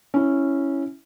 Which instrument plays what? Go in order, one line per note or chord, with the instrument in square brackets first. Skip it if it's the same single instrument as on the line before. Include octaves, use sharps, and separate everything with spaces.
[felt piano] C#4 E4